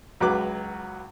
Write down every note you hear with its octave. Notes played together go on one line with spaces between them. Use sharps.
C#2 F#3 B4 D6